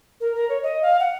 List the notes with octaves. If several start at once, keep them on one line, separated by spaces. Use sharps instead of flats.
A#4
A#4
C#5
D#5
F5
F#5